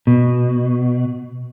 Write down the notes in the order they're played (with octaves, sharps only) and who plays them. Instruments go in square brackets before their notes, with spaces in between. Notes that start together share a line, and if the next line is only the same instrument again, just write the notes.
[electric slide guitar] B2